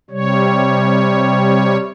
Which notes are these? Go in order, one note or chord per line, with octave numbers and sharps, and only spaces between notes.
C3 G3 C#5